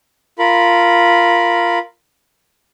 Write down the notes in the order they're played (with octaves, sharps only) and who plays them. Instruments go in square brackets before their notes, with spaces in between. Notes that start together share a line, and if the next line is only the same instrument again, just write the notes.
[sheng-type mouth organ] F4 A#4 B5